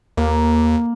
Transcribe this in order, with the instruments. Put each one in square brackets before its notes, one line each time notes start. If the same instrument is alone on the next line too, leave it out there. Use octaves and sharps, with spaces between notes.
[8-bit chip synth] D#2 [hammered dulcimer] A#3